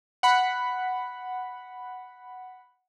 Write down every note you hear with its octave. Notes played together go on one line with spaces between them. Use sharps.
F#5 B5